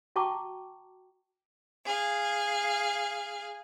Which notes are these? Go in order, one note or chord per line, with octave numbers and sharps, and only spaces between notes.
F#4 G5 A5 A#5 C#6 D6
G#4 F5